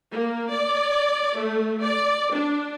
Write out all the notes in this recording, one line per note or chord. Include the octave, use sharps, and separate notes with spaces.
A#3
D5
A3
D5
D4